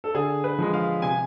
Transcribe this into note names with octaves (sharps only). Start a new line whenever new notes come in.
A4
D3 G#4
B4
F3 G#3
F5
C3 G#5